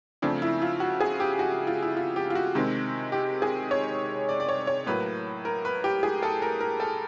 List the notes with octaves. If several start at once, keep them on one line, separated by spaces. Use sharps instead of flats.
C#3 F3 A3 C4 D4
E4
F4
F#4
G#4
G4
F#4
F4
E4
F4
G4
F4
F#4
C3 D#3 G#3 C4
G4
G#4
C#5
D5
D5
C#5
C#5
A2 F#3 A#3 B4
A#4
B4
G4
G#4
A4
A#4
A#4
A4